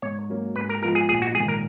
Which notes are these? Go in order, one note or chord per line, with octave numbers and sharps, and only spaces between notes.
G#2 C#5
F#3 A#3 C#4
G#2 B4
A#4
F3 G#3 B3 F4 A#4
G#4
A#1 G#4
F#4
G#2 D#3 G#4
A#4